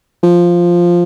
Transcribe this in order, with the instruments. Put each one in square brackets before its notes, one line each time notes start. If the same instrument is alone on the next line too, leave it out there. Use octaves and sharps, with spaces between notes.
[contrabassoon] F3